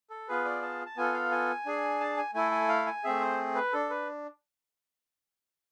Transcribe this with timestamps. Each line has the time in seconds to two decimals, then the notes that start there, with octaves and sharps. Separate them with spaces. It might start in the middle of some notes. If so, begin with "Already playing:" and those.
0.10 A4
0.28 B3 F4 G#4 B4
0.45 D5
0.62 A5
0.86 A5
0.97 B3 F4 A4 G#5
1.14 F5
1.31 G#5
1.66 D4 G#4
2.00 A5
2.17 G#5
2.34 A3 E4 A4 G#5
2.51 G#5
2.69 F5
2.86 G#5
3.04 A3 C4 G#4 E5
3.21 C5
3.55 B4
3.73 D4 A4
3.90 B4